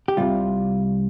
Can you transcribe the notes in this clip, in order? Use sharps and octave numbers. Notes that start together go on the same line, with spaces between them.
G4
C2 C3 G3 F4